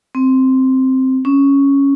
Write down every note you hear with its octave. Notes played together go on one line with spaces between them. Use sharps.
C4
C#4